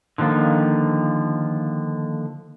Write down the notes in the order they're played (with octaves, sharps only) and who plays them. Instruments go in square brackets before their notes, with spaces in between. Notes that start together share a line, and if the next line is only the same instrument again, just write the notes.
[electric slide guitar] D3 D#3 F3 A#3 F4